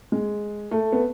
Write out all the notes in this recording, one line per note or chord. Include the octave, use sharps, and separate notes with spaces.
G#3
A3
B3